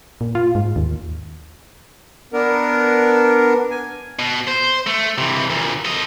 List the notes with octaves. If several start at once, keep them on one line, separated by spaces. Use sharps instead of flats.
A#2
F4
G#2
D#2
B3 D4 A#4
G#5
B2
C5
A3
C3 E3
D2 A#2
A4 D#5